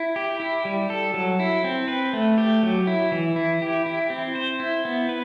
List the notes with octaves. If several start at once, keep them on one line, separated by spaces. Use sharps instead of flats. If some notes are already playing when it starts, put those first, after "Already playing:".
Already playing: E4
G4
E4
G3
A4
F#3
E4
C4
B4
A3
G4
F#3
E4
E3
E4
G4
E4
C4
C5
E4
B3
B4